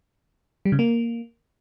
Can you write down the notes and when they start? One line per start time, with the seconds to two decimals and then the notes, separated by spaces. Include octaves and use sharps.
0.65 G3
0.72 C#3
0.79 A#3